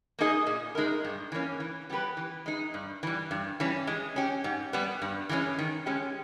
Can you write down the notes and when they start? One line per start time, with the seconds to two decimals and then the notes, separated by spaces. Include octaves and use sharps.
0.19 A#3 D#4 G#4 D#5
0.47 A#2
0.75 G#3 D#4 A#4
1.05 G2
1.32 E3 A#3 C#4
1.60 E3
1.90 G3 B3 G4 B4
2.17 E3
2.46 G#3 D#4
2.74 G2
3.03 E3 G3
3.31 G2
3.60 E3 G3 C#4
3.87 G#3
4.16 C#4 G4
4.44 G#2
4.73 G3 B3
5.02 G2
5.29 E3 G#3 C#4
5.59 D#3
5.86 G#3 C#4 G4